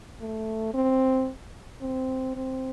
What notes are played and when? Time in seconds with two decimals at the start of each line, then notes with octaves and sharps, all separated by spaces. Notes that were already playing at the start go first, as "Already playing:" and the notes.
0.21 A3
0.74 C4
1.82 C4
2.36 C4